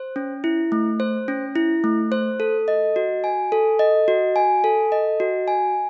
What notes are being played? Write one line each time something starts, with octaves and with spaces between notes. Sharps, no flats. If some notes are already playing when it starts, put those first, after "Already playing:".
Already playing: C5
C#4
E4
A3
C5
C#4
E4
A3
C5
A4
D#5
F#4
G#5
A4
D#5
F#4
G#5
A4
D#5
F#4
G#5